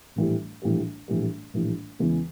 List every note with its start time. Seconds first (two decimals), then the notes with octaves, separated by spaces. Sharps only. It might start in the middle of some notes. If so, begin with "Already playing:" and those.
0.16 A#1 A2 E3 G3
0.62 A#1 A2 E3 G3
1.08 A#1 A2 E3 G3
1.54 A#1 A2 E3 G3
1.99 E2 C#3 E3 G#3